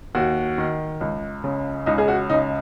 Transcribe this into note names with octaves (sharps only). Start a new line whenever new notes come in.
D#2 F#4
D#3
C#2
C#3
C#2 D#4
G#4
F#4
C#3 D#4